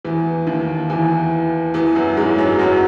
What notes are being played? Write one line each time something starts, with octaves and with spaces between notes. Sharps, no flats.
E2 E3
D#2 D#3
E2 E3
E2 E3
F#2 F#3
G#2 G#3
F#2 F#3
F#2 F#3